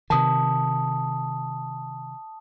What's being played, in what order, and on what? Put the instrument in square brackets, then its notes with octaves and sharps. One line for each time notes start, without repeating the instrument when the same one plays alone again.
[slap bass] C3 D#3 [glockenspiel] A5 D#6